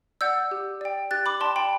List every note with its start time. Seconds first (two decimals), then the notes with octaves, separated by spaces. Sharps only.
0.21 D5 F#5 E6 G6
0.51 G4
0.81 D5 G5
1.11 G4 F#6 A6
1.26 B5 D6
1.40 D5 G5 A5 C6
1.56 G5 B5